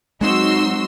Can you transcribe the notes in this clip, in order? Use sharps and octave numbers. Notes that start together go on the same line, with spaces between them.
F#3 G#3 B3 C4 D#4 F#4 C6 E6